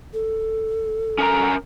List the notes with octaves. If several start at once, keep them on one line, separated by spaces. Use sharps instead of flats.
A4
C#4 A#4 A#5